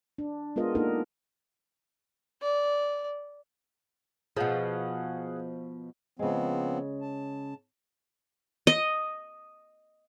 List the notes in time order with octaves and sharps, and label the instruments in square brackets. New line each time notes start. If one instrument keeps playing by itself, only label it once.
[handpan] D4
G#3 B3 F4 A#4 D#5
A#3 D4 D#4 A4 A#4
[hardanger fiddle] D5
[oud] B2 F3 [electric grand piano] G#4 F5 F#5
[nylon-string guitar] C#3 G#3 [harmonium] F3 B3 C4
[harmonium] A5
[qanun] D#5